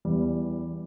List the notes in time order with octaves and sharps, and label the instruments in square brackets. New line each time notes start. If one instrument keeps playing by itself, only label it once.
[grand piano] E2 E3 G3